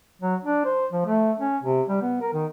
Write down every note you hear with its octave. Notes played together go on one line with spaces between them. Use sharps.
F#3
D4
C5
F3
A3
C#4
C3
G3
B3
A#4
D#3